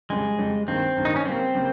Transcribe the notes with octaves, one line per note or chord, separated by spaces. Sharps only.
F2 C#3 G3 G#3
F2 C#3 G3
G2 D#3 A#3 C4
G2 D#3 A#3
D#4
C#4
C#3 G3 A#3 C4
C#3 G3 A#3